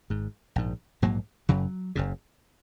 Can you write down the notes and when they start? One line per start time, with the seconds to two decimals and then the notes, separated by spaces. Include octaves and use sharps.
0.10 G#1 G#2
0.56 A#1 G#2
1.02 A#1 G#2 F#3 A#3
1.49 F#1 F#2 C#3 F#3
1.95 F#1 F#2 C#3